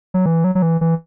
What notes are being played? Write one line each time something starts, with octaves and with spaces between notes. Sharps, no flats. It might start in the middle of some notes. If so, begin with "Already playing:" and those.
F#3
E3
F#3
F#3
E3
E3